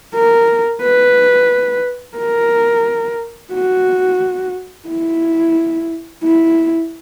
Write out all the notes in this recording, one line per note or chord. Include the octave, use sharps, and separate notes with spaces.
A#4
B4
A#4
F#4
E4
E4